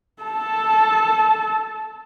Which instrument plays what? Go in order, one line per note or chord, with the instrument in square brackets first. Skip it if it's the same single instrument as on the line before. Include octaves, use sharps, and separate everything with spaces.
[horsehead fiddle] A4 A5